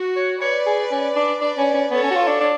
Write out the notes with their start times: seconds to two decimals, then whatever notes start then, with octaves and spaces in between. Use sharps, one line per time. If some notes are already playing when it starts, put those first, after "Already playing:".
Already playing: F#4
0.16 C#5
0.41 B4 C#5 D5
0.66 G#4
0.91 C#4
1.16 D4
1.40 D4 B4 D5
1.57 C#4
1.74 C#4
1.90 B3 A4 C#5
2.03 C#4
2.11 F#4
2.15 F4
2.27 D4
2.41 D4